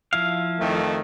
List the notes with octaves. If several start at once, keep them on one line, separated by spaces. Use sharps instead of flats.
F3 E4 F5
F2 D#3 A3